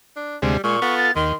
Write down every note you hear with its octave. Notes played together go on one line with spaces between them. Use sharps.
D4
D2 C3 G3 G#3
A#2 G#3 C#6
B3 F4 A4
A6
D#2 D#3 C6